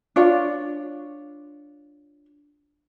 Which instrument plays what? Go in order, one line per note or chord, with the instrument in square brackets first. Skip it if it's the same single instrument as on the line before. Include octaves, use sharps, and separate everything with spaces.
[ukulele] D4 F4 C#5